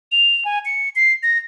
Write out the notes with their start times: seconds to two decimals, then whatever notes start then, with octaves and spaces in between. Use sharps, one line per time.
0.12 F7
0.45 G#5
0.65 C#7
0.96 C7
1.23 A#6